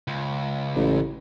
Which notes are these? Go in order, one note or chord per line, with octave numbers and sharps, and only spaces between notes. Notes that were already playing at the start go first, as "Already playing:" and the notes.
C#2
A1